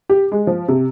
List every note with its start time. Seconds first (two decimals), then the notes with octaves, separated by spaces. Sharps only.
0.10 G4
0.32 G#3
0.47 F3
0.68 C3